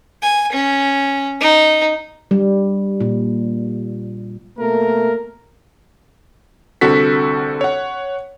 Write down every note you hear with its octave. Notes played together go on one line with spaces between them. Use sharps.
G#5
C#4
D#4
G3
A#2
B2 A3 A#3 A#4
C2 D3 C4 F#4 A4 B6
C#5 F#5